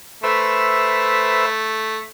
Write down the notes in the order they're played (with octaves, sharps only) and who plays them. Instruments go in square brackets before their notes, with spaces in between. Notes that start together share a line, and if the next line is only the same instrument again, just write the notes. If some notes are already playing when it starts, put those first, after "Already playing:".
[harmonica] A3 [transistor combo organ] B4 C5 E5